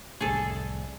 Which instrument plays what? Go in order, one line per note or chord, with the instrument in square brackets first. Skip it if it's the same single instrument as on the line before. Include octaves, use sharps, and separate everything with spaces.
[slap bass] C2 F2 A2 [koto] G#4 A4